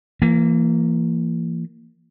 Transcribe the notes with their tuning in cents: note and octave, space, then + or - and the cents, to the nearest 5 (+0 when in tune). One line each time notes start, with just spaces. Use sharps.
E3 +35 A#3 -15